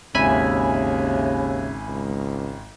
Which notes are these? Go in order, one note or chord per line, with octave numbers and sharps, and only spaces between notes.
G#1 D#2 C#3 E5 G#5 B5
C#2